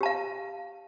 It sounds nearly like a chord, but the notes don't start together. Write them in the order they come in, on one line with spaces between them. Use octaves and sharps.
G4 A5 F5